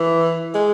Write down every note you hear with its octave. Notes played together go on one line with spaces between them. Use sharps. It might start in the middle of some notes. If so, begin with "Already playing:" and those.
Already playing: E3
G#3